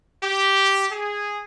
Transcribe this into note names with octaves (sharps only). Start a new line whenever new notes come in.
G4
G#4